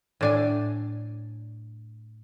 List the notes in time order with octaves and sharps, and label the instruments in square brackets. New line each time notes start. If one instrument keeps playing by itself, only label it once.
[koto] A2 D4 G#5